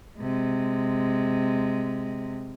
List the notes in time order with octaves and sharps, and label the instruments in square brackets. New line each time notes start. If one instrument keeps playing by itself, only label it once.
[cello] C3 G#3